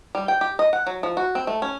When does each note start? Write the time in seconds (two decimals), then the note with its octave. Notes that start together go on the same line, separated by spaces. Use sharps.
0.15 G3
0.28 G5
0.41 G4
0.59 D#5
0.73 F#5
0.87 F#3
1.03 F3
1.17 F#4
1.35 C4
1.47 A3
1.62 C#4